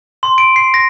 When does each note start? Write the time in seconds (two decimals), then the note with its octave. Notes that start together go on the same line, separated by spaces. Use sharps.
0.23 C6
0.38 D7
0.56 C7
0.74 A#6